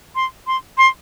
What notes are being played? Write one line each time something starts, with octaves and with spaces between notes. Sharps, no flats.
C6
C6
C6